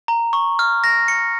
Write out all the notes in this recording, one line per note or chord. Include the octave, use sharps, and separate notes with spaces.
A#5
C#6
F6
A#6
C#7